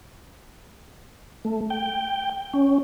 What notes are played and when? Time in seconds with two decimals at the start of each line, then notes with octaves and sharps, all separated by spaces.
1.45 A3
1.70 G5
2.54 C#4